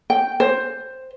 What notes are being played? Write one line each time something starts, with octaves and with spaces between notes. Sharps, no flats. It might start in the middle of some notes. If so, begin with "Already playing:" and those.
G5
C5